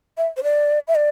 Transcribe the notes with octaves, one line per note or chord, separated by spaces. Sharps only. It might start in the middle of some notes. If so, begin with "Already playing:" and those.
E5
C5
D5
E5
D5